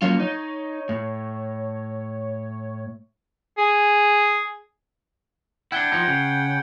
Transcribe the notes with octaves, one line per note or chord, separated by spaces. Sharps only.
F#3 A#3 C#4 F4
D#4 C#5
A2
G#4
D4 E4 F#5 G5 G6 G#6 G7
F3 D#4
C#3